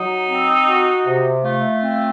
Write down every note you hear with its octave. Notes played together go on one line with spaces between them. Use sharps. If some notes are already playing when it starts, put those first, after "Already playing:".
Already playing: F#3 D#4
C4
F#4
C3
A3 F4
C4